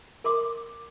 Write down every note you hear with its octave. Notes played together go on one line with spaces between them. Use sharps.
A#4 C6 D6 D#6